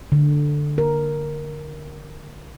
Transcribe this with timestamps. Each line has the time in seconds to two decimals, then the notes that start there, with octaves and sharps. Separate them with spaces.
0.12 D3
0.78 A#4